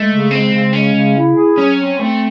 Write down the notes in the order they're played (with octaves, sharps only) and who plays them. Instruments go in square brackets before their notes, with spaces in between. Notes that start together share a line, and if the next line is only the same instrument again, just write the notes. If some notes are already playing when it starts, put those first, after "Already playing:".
Already playing: [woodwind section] G#3 [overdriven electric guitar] A3
[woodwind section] C#3
[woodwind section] G#3 [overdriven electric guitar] C4
[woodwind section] C#3
[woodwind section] G#3 [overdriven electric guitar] C#4
[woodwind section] C#3
E4
G#4
[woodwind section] F#3 [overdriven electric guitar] C#4
[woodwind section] C4
[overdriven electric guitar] A3 [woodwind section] C4